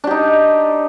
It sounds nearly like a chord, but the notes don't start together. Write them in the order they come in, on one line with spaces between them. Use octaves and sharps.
D4 G4 D#4